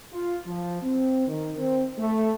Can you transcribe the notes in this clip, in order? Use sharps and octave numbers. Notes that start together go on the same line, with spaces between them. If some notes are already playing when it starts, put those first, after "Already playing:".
F4
F3
C4
D#3
C4
A3